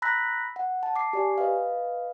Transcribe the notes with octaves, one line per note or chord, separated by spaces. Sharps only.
A#5 B5 E6 F#6 A#6 B6
F#5
A5
D6 C7
G4 D5 G#5
B4 D#5 F5